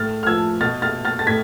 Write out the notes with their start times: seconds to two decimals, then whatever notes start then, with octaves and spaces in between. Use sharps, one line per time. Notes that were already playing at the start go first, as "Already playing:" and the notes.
Already playing: A2 F6 A6
0.23 F6
0.27 F3 E6 G#6
0.61 B2 F6 A6
0.82 F6 A6
1.05 F6 A6
1.19 A6
1.27 A2 G#6 B6